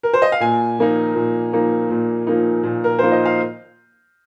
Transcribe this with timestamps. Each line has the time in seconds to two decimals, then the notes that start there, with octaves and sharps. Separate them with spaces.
0.03 A#4
0.13 C5
0.22 D#5
0.32 F5
0.40 A#2 G#5
0.79 F3 A#3 D#4
1.15 A#2
1.53 F3 A#3 D#4
1.90 A#2
2.27 F3 A#3 D#4
2.63 A#2
2.84 A#4
2.99 F3 A#3 D#4 C5
3.12 D#5
3.25 F5